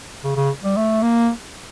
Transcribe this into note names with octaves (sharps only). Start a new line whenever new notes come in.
C#3
C#3
G3
A3
A#3